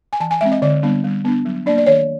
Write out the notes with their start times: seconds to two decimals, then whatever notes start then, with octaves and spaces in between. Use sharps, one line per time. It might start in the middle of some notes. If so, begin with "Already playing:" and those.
0.13 G#5
0.20 E3 A5
0.31 G#5
0.41 G#3 C4 E5
0.52 D#5
0.62 D3 D5
0.83 G3 B3 D4
1.04 G3
1.25 B3 D4
1.45 F#3
1.66 A#3 D4 D5
1.78 D5
1.86 D#3 C#5